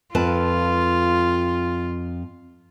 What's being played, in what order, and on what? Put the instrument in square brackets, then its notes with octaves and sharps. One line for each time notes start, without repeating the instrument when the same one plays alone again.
[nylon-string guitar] F2 B4 A5 [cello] F4